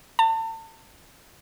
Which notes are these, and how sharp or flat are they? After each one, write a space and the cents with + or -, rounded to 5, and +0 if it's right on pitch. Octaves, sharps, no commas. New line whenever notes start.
A5 +35